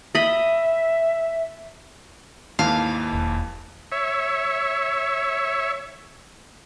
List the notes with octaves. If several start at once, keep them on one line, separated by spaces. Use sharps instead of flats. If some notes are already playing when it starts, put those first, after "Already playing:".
D#5 E5 B5
D#2 G#2 E3 F5 A5
E1
C#5 E5